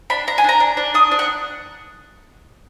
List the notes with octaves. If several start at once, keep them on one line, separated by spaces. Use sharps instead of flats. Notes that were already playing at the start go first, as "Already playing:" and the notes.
D4 B5
D4 A#5
G#5
D4 A#5
D4
D4
D4 D#6
D4
F#5